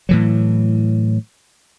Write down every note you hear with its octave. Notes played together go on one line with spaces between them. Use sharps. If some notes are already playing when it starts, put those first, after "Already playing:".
A2 E3 F#3